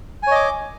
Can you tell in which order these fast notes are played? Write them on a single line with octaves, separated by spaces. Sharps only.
G#5 C#5 D#5 D6